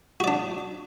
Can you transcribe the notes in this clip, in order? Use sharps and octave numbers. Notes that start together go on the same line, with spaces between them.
D4 F#4 D5